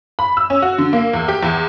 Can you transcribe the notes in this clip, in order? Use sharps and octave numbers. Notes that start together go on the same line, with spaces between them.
B5
E6
C#4
F#4
D3
A#3
E2
G4
E2